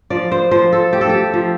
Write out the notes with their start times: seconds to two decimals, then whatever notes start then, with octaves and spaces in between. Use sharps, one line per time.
0.10 F3 D5
0.32 C5
0.51 F3 C5
0.73 A4
0.93 A3 G4
1.01 A4
1.09 G4
1.34 F3